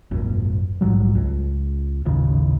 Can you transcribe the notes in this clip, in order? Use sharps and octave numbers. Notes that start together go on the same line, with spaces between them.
D#1 G#1 F#2
A#1 G#2 F#3 G3
C#2
D#1 A1 D#2 C#3